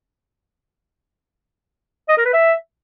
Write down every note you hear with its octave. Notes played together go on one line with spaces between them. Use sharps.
D#5
A#4
B4
E5